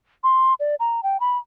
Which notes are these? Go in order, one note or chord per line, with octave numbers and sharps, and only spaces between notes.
C6
D5
A#5
G5
B5